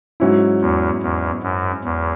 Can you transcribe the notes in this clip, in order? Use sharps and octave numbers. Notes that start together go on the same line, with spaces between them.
G#2 F#3 C#4 E4
E2
E2
F#2
E2